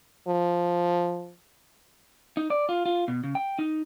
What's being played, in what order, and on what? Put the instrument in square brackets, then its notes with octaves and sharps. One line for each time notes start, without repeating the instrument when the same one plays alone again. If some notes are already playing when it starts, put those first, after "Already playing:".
[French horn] F3
[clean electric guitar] D#4
D5
F4
F4
B2
C#3
G5
D#4